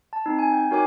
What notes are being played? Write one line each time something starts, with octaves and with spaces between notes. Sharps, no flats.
A5
C4 D#4
G#5
G5
D#4 F#4 A#4 C#5 G#5 D6